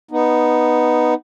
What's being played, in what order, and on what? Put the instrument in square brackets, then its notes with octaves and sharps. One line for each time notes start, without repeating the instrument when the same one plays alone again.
[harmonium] B3 D#4